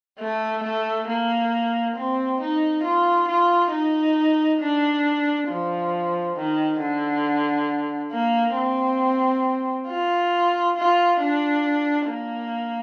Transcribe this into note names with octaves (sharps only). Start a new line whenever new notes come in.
A3
A3
A#3
C4
D#4
F4
F4
D#4
D4
F3
D#3
D3
A#3
C4
F4
F4
D4
A#3